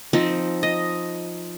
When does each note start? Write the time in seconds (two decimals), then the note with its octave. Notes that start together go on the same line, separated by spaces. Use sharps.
0.13 F3 C4 D#4
0.63 D#5